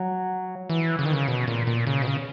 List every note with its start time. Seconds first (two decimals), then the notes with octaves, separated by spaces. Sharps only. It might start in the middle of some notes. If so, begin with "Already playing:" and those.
Already playing: F#3
0.69 E3
0.99 C#3
1.05 D#3
1.13 C#3
1.28 B2
1.47 A#2
1.67 A#2
1.87 C#3
2.02 B2
2.07 C#3